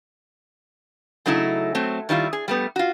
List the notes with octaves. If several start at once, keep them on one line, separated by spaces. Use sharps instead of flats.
C#3 F#3 A3 D#4 E4
F#3 A3 C4
D#3 G3 E4 F4
G#4
G3 A3 B3
F4 F#4